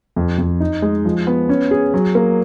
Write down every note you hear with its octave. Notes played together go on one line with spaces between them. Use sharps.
F2
F2
D#4
G#3
F3
B3
C#4
G#4
F#3
A#3